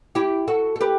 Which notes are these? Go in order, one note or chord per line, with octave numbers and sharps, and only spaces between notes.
E4 G4
F#4 A4
A4
G4 B4